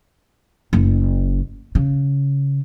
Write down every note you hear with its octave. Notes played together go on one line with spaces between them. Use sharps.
F#1
C#3